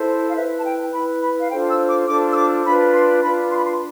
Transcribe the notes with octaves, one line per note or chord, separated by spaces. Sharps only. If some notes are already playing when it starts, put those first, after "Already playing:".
Already playing: E4 A4 C5
F5
E4 B4 E5
A5
G5
E4 B4 B5
B5
F5
D4 F4 A4 C5 G5
E6
D6
D4 F4 A4 C5 D6
E6
D6
D4 F4 B4 B5
C6
D4 F4 B4 B5
C6
B5
C6